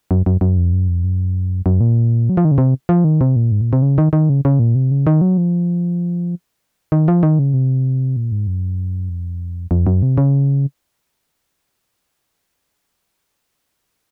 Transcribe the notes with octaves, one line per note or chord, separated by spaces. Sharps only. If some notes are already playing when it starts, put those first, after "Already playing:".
F#2
F#2
F#2
F2
F#2
F2
F#2
F#2
A#2
F#3
F3
D#3
C#3
C3
F3
D#3
C3
A#2
G#2
A#2
C3
C#3
D#3
D#3
C#3
C#3
A#2
C3
C#3
D#3
F#3
F3
D#3
F3
D#3
C#3
C3
A#2
G#2
F#2
F2
F2
F#2
C3
C#3